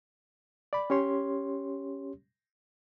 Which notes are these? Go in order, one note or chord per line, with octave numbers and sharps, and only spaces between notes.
D5 B5
C#4 G4 C#5 C6